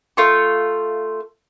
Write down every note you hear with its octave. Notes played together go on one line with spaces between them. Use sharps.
A3 F4 C#6